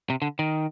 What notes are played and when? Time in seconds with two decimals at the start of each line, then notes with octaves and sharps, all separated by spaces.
0.10 C3
0.22 D3
0.39 D#3